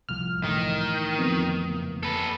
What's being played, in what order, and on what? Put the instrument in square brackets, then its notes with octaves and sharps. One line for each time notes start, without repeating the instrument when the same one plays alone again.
[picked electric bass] D1 C2 F3 [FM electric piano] F6
[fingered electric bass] G1 A2 E3 [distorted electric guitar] D#3
[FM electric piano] F2 [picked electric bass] B3
[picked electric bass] F#1 A#3
[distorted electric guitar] A4 B4